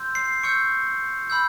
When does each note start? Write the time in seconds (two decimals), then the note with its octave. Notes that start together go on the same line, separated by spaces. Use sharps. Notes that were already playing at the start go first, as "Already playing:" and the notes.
Already playing: C6 E6 G6
0.15 C7
0.43 C#6 E6 G6 C#7
1.30 B5 E6 G6